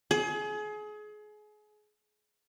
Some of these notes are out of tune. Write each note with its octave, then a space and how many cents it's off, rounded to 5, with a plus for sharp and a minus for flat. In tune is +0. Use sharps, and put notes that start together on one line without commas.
G#4 +30